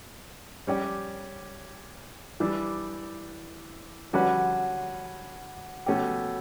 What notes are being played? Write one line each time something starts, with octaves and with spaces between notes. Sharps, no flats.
G3 C#4 G4 D5
E3 G3 D4
D3 G3 C#4 F#4 B4
B2 A3 C#4 G4